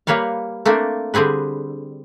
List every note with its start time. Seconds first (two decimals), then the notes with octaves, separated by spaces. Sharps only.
0.07 G3 A#3 B4 C#5 F5
0.65 A3 A#3 C4 D4
1.14 D3 G3 C4 G#4 B4